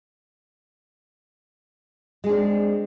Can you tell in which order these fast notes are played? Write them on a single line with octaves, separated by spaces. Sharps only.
G#3 G#4 D4 C4